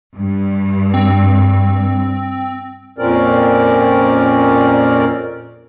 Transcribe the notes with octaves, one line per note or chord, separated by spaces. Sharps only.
G2
C4
F2 A#2 C4 C#4 A#4 D5